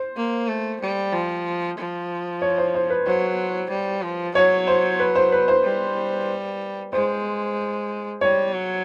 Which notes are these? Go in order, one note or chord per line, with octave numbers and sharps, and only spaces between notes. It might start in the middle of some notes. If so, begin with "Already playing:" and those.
Already playing: C5
A#3
A3
G3
F3
F3
C#5
C5
C5
B4
F#3 C5
G3
F3
F#3 C#5
C5
B4
C5
B4
C5
G3
G#3 C5
G3 C#5
F#3